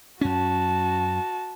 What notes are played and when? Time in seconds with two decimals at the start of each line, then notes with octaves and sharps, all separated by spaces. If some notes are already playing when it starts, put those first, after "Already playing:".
0.21 F#2 C#4 F#4 A5